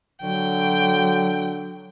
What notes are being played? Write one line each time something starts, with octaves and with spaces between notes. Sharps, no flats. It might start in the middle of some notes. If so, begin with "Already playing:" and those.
D3 F#3 G5